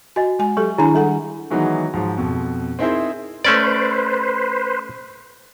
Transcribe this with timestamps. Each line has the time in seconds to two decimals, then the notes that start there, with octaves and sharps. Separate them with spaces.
0.16 F#4 D#5 G#5
0.39 G#3 G#5
0.57 F#3 G4 A4 C#6
0.78 D#3 D4 E4 G#4 G#5 A#5
0.95 G3 A4 F#5
1.50 D#3 E3 F#3 G#3 B3 D#4
1.93 G#2 F3 F#3
2.17 F2 B2
2.79 C4 D#4 E4 G#4 A#4 C5
3.45 A3 C#4 B4 C5 D5